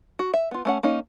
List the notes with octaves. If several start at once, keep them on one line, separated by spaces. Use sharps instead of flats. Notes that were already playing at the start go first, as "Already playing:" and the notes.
F#4
E5
B3 F4
A3 C#4 F#5
A#3 C#4 D#4